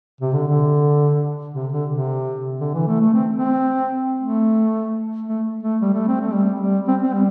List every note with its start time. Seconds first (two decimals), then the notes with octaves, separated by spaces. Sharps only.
0.21 C3
0.33 D3
0.47 D3
1.54 C3
1.72 D3
1.89 C3
2.60 D3
2.74 E3
2.87 A3
3.00 A3
3.13 C4
3.36 C4
4.20 A3
5.28 A3
5.63 A3
5.81 G3
5.94 A3
6.08 C4
6.21 A3
6.34 G3
6.60 G3
6.88 C4
7.02 C4
7.14 G3